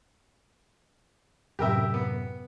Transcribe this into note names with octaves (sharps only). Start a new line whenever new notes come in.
F#2 A2 C3 G4 A#4 E5
B3